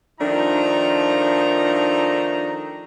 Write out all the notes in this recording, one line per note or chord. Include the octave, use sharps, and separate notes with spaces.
D#3 F3 A3 D4 D#4 A#5